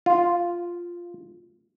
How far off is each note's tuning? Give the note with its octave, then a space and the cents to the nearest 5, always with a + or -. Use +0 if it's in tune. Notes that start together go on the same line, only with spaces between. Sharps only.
F4 +0